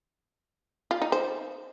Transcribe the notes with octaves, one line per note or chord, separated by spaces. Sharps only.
F4
D#4
C5